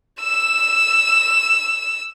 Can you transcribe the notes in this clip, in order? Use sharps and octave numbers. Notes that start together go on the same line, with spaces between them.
E6 E7